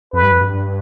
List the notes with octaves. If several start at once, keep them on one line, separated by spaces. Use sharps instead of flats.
F2 B4
G2
F2
G2